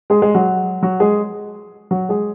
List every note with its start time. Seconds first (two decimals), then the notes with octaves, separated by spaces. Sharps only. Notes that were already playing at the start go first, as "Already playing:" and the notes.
0.10 G#3 G#4
0.22 G#3 G#4
0.35 F#3 F#4
0.83 F#3 F#4
1.00 G#3 G#4
1.91 F#3 F#4
2.09 G#3 G#4